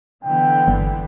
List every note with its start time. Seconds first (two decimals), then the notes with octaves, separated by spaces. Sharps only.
0.25 D3 E3 B3 G5
0.68 G1